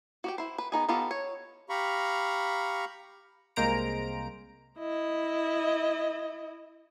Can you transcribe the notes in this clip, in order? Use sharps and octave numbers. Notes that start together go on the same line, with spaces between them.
F#4 G4 G5
E4 C5
B4
B3 D#4 G#4
B3 D#4 F4 G4 A4
C#5
G4 F5 A#5 B5 C#6
C2 G#3 A#3 C5 A#5 D7
E4 D#5